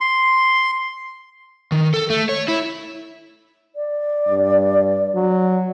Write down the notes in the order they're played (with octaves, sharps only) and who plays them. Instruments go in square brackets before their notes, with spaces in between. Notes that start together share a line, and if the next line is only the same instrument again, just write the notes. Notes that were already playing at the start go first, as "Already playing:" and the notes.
[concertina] C6
[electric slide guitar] D#3
A4
A3
C#5
E4
[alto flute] D5
[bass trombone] G2
F#3